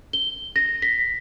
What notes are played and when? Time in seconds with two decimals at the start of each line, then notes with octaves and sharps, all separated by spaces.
0.13 G7
0.56 A#6
0.82 B6